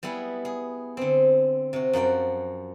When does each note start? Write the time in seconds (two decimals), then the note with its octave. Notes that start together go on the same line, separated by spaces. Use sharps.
0.03 G3 B3 E4 G#4
0.45 G#4
0.97 D3 C4
1.73 C3 F#4
1.93 F#2 F3 F#4 G5